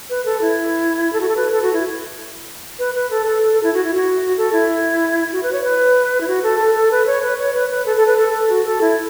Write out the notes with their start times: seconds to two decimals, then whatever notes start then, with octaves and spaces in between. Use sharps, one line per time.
0.10 B4
0.25 A4
0.41 E4
1.13 A4
1.21 F#4
1.29 A4
1.37 B4
1.52 A4
1.62 F#4
1.73 E4
2.79 B4
2.95 B4
3.11 A4
3.26 A4
3.42 A4
3.53 A4
3.63 E4
3.74 F#4
3.85 E4
3.95 F#4
4.38 A4
4.53 E4
5.32 F#4
5.43 B4
5.53 C#5
5.64 B4
6.21 E4
6.27 F#4
6.43 A4
6.59 A4
6.75 A4
6.91 B4
7.07 C#5
7.23 B4
7.38 C#5
7.54 B4
7.70 B4
7.86 A4
7.96 A4
8.07 B4
8.18 A4
8.33 A4
8.49 F#4
8.65 A4
8.81 E4